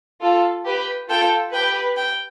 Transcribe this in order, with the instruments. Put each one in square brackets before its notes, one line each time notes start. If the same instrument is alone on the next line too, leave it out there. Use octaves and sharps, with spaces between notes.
[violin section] F4 A4
G4 B4
[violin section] F4 A4 [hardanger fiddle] G5
[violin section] G4 B4 [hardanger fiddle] G5
[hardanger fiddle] G5